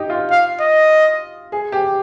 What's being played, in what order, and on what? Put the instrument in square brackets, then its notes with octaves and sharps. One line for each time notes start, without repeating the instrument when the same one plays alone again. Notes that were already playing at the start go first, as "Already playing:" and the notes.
Already playing: [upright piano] D#4 G4
F4
[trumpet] F5
D#5
[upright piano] G#4
G4